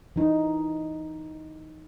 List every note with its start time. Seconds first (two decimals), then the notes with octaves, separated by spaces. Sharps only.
0.16 E3 D#4